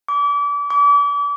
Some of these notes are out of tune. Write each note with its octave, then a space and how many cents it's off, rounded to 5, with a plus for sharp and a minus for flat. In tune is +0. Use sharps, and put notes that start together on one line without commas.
D6 -30
D6 -35